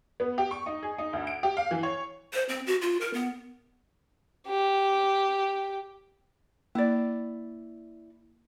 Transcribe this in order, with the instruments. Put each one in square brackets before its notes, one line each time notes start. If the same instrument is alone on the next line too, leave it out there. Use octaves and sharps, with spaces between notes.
[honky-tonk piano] B3
G4
C#6
D#4
G#4
D#4
D2
D7
G4
F5
E3
C#5
[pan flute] C5
C4
F#4
F4
A#4
B3
[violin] G4
[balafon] A#3 [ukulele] E4 D5